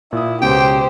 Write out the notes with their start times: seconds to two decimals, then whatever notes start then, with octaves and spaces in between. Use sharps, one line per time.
0.13 A#2 E4 D#6
0.42 C#2 B2 C#4 G4 C5 G5